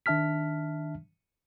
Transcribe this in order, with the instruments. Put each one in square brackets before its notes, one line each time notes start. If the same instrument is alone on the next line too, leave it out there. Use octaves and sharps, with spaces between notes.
[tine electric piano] D#3 D4 E5 A5 F6 B6